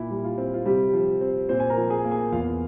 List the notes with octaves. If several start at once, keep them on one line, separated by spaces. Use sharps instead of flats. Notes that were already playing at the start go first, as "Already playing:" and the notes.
Already playing: A#2 E4
G3
F4
C4
F4
C3 G3 G4
F3
C4
A#2 C4 C5
G#5
A#4 A#5
F3
G#4 G#5
A#3
G#4 G#5
E2 F4 F5